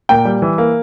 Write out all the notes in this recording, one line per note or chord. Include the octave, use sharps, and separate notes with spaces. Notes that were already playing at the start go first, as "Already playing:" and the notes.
A#2 G5
G3
E3
A#3